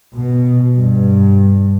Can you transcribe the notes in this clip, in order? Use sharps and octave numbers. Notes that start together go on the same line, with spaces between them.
B2
G2